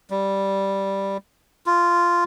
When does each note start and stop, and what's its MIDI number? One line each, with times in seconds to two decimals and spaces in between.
0.10 1.17 55
1.66 2.24 65